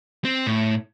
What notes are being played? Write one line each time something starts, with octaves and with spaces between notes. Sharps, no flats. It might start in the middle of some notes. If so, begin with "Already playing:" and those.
C4
A2